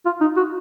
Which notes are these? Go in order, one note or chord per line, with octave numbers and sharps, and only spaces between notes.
F4
D#4
F#4